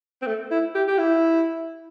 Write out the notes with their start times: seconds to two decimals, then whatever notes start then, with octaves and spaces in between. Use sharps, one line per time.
0.22 C4
0.26 A3
0.51 E4
0.75 G4
0.88 G4
0.98 E4